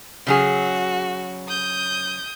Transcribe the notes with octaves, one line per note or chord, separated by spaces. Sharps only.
C#3 F#3 F#4 G#4
D#6 G6